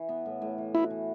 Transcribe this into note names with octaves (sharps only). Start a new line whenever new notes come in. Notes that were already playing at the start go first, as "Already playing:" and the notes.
Already playing: E3
B3
A2
A2
E3
E4 F#4
E3